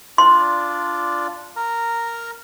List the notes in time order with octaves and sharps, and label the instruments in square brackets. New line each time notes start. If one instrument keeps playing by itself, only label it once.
[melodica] D4 F4 D5 [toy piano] C6
[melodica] A#4 A#5